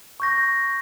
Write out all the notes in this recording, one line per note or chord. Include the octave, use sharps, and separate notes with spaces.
C#6 G6 A#6